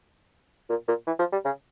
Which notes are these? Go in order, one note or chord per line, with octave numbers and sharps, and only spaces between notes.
A#2
A#2
E3
F3
G3
C#3